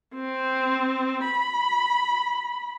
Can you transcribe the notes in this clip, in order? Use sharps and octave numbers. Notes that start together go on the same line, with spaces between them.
C4
B5